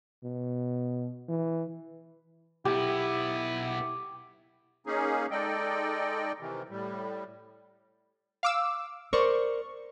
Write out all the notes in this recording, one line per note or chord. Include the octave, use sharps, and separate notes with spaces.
B2
E3
B1 B3 E4 G4
A#3 C#4 D#4 G#4
G#3 D#4 A4 D5 D#5 G5
C3 D#3 E3
A2 G3
F5 D6 E6
A#4 C5 D5 C#6